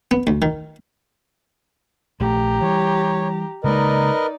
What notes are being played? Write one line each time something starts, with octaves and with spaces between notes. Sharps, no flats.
B3
D2
D#3
A#1 A3 G4 A#5
E3 G3 C#5
C#3 G#3 A#3 D#4 A#4 B4 D5 D#5